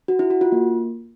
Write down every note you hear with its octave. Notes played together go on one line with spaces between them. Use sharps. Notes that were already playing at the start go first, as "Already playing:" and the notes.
F#4
E4
F#4
F4
A#3